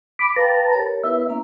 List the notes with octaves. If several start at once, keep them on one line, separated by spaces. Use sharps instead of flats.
B5 D6
B4 F5 G5 A5 A#5
G4 A#4 C#5
B3 E4 B4 E5
A#3 C#4 A#5